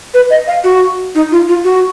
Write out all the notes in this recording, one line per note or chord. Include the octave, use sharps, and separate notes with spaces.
B4
D#5
F5
F#4
D#4
F4
F4
F#4